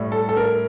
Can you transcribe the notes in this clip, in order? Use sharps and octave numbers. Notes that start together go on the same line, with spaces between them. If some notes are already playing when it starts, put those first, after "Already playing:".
Already playing: A2 G3
A4
A4
A#4